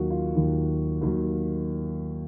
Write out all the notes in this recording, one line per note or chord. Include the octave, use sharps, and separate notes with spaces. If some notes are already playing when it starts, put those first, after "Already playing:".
Already playing: D#2 D#3 F#3 F4 F#4
F4
D#2 D#3 F#3
D#2 D#3 F#3